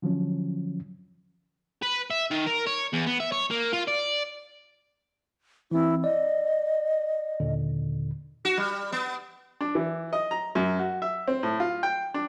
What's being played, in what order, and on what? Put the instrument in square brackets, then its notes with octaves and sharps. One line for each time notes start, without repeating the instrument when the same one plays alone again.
[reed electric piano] D3 F3 F#3 C#4
[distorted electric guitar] B4
E5
D#3
A#4
C#5
E2
B3
E5
C#5
A#3
F4
D5
[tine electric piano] E3 C4 [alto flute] E4
[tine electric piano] D5 [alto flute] D#5
[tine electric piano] D#2 A#2 D3
[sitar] F#4
G3
B3
[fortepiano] D4
E3
D#5
A#5
F#2
F#4
E5
C4
A2
F4
G5
D4